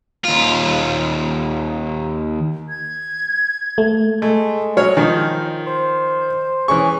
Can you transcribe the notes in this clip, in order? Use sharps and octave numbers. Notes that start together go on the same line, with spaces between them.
D#2 F4
G#6
A3
G#3 A3
F#3 C#5 F6
D#3 F3
C5
E3 C#4 G#4 C#6